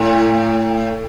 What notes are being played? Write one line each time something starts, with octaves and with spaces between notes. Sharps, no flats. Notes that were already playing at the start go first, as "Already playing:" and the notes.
Already playing: A2